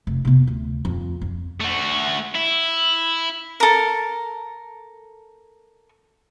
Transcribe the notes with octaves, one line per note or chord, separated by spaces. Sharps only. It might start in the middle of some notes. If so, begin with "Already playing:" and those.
F1
C3 B3
D2
F2
F2
A3 F#4
E4
A4 A#4